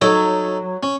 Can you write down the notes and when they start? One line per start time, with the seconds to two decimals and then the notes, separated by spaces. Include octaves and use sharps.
0.01 F#3 D#4 A4
0.83 C#4